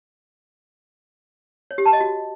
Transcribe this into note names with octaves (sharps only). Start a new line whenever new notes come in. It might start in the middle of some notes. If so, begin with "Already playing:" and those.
C#5
G4
A5
D#5
F#4